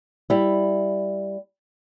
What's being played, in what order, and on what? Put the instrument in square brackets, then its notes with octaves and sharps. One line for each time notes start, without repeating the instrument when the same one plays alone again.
[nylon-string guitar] G3 E4